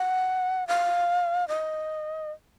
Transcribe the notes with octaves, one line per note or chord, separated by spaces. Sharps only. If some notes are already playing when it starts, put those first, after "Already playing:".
Already playing: F#5
F5
D#5